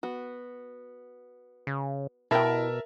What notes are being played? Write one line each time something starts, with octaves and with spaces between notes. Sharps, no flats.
B3 F#4
C#3
B2 E4 G4 A#4 E5 G5 A5